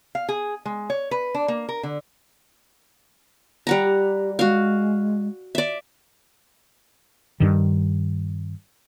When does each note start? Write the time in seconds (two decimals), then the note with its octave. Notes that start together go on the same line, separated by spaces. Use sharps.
0.15 F5
0.29 G#4
0.65 G#3
0.90 C#5
1.11 B4
1.34 D4
1.48 A#3
1.69 A#4
1.83 D3
3.67 G3 F#5 A#5
3.82 G4
4.39 G#3 F#4 F5
5.55 D5 E5
7.40 G2 D#3